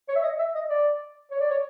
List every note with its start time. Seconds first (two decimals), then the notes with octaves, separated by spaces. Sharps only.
0.09 C#5
0.16 E5
0.23 D#5
0.39 E5
0.55 D#5
0.70 D5
1.31 C#5
1.40 D5
1.50 C#5